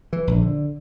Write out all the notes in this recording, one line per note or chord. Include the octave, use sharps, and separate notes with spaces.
E3
A#1
D3